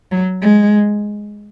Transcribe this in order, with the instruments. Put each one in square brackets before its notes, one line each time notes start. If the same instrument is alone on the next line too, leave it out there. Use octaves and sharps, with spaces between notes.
[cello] F#3
G#3